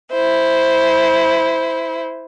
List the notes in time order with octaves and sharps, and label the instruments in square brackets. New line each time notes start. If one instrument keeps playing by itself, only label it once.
[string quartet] E4 C5